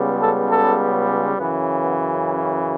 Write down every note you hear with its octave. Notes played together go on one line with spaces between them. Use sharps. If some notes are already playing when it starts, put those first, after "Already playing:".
Already playing: C#2 C#3 G3 B3
A4
A4
F#2 C#3 E3 B3
B3
C#4